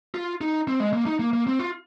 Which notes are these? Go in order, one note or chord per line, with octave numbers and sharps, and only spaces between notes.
F4
D#4
C4
G#3
A#3
D#4
A#3
A#3
C4
F4